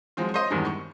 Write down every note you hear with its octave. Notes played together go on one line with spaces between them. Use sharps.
F3 F#3 G#3 C4 F4
C5 C#5 D#5 C6
E2 G2 D#3 G3 G#3 C4
C#6